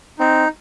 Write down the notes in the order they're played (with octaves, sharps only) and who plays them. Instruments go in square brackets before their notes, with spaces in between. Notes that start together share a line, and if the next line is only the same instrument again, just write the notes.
[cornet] C4 [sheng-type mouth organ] D#4